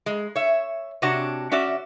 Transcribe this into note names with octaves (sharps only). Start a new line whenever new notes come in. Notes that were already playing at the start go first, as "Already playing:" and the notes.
G#3
C#5 E5
C3 C4 D4 F#4 C#5 F#5
C#4 F#4 D5 E5